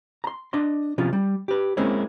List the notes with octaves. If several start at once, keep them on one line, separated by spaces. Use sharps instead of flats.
A#5 C6
D4 D#5 C6
C3 F3 C#4 F4
G3
G4 B4
G#3 A#3 C4 C#4 E4